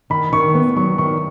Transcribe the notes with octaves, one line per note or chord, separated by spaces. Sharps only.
D#3 B5
D#3 C#6
B3
F#3 C#6
D#3 C#6